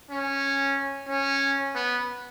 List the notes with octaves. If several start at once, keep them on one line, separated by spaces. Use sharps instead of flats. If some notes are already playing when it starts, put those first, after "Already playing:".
C#4
C#4
B3